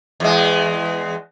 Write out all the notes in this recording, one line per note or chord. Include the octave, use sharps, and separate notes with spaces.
E2 G#3